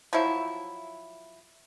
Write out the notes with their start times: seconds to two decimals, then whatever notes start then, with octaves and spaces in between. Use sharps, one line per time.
0.13 F3 F#3 E4